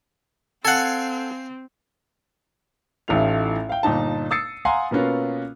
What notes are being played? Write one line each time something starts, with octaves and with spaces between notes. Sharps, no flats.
C4 A4 F5 F#5 G#5
A1 A2 A3 D#4 F4 F7
F5 G5
G1 A#2 D#4 A5
D#6 E6 A6 C7 C#7
F5 F#5 G#5 A#5 C6
B2 A#3 B3 C#4 F4